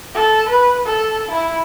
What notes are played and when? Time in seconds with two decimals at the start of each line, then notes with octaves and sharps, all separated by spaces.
0.15 A4
0.49 B4
0.86 A4
1.31 E4